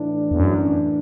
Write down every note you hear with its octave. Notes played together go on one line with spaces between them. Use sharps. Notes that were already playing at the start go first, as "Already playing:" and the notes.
Already playing: A2 E3 D4
E2
F#2